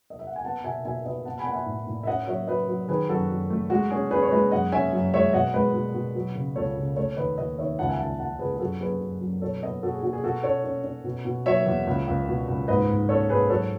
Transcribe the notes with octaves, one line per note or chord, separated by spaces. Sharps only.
D#5
E5
F#5
G#5
B3 F#5 A5
B2 E5 G#5
B2 E5 G#5
B2 B4 D#5
B3 F#5 A5
G#5 B5
B3 F#5
E5 G#5
A2
A2
E5
C#4 D#5 F#5
F#3 C#5 E5
F#3 B4 D#5
F#3
D#3 G#4 B4
F#2 F#4 A4
F#2
A3
G#3 F#4
C#4 G#4
C#4 G#4 B4
C#5
G#3 B4 D#5
F#2 D#5 F#5
C#4 E5 G#5
F#2
G#3 C#5 E5
B2 D#5 F#5
G#3 B4 D#5
B2
B2
F#3
C#3
C#2 A4 C#5
C#3
A3 A4 C#5
D#2 B4 D#5
D#2 B4 D#5
D#3 C#5 E5
C#2 F#5 A5
E5 G#5
C#2 F#5 A5
C#2 F#5 A5
C#2 G#4 B4
G#4
F#2 F#4 A4
F#2 G#4 B4
F#2
F#2
B2 A4 C#5
B3 B4 D#5
B2 F#4 A4
G#4
B2 F#4
G#4
B2 F#4 A4
C#4 A4 C#5
C#4
C#4
B2
B2
F#3 C#5 E5
E2
C#2
C#2
B2
C#2
G#2 B4 D#5
G#2
C#4 A4 C#5
G#2 G#4 B4
F#3 A4 C#5